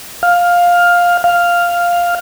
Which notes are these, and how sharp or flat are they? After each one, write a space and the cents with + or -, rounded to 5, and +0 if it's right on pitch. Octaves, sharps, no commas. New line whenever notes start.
F5 +10
F5 +0